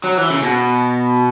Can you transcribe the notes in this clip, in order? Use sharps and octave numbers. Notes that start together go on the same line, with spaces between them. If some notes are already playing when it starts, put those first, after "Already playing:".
F#3
E3
C#3
B2